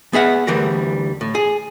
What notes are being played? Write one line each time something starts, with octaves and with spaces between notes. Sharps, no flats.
B3 G#4 E5 F#5
D2 E3 G3 A#4
A2
G#4